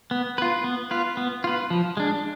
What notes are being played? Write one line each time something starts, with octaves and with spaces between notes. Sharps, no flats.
B3
F4 B4
B3
F4 B4
B3
F4 B4
F3
G#3 D4